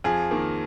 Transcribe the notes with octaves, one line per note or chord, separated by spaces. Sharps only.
F2 G#4
D#3 A#3